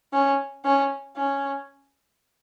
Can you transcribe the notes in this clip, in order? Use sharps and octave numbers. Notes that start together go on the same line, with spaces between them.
C#4
C#4
C#4